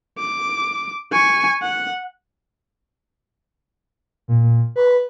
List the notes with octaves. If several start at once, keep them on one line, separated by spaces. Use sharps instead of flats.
D6
G#5 C#6
F#5
A#2
B4